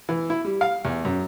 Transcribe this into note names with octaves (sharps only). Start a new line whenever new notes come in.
E3
E4
G3
F5
E2
F#2